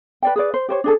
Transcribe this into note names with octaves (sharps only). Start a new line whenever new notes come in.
B4 D5 G5
G#4 B4 D5
C5
G4 C5 C#5
D4 G#4 A4